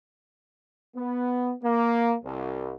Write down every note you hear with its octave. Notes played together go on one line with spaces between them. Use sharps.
B3
A#3
C2